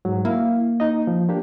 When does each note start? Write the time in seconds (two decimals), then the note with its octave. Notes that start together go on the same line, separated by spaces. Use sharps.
0.05 G#2 F#3
0.25 A#3 E4 F5
0.80 D#4 D#5
1.07 F3
1.29 A#3 D4 G4